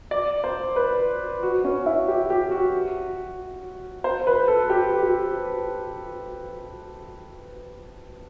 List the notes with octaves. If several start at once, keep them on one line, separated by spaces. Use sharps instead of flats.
D5
C5
B4
F#4
C#4
E4
G4
G4
F#4
C5
B4
A4
G4
G4